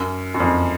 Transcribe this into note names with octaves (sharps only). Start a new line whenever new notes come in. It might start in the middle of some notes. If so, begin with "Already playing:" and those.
Already playing: F#2
F#2
F2